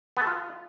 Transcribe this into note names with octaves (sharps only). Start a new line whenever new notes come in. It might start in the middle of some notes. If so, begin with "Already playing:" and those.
B3
A4
F4